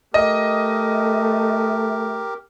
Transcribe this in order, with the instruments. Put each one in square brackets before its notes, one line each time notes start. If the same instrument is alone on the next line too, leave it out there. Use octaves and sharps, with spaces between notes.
[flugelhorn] A3 [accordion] G4 A#4 [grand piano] D#5